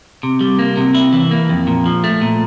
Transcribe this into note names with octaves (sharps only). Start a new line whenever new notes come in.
C3
G3
A#3
C3
E4
E3
A#3
F2
A#2
F3
A3
A#2